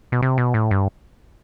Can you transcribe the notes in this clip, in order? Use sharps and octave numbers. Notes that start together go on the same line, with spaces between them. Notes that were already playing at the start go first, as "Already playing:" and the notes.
B2
C3
B2
A2
G2